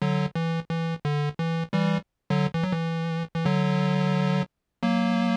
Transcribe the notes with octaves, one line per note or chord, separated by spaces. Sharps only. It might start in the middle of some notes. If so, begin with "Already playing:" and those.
D3 F#3
E3
E3
D3
E3
E3 G3
D3 F#3
E3
F#3
E3
E3
D3 F#3
F#3 A#3